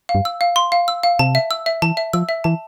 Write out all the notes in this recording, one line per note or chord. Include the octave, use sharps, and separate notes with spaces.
F5
G2
E6
F5
C6
F5
E6
F5
C3 A5
E5
E6
E5
E3 A5
E5
F3 E6
E5
E3 A5